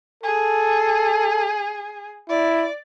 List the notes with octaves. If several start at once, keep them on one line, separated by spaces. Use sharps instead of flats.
G#4 A4
E4 D5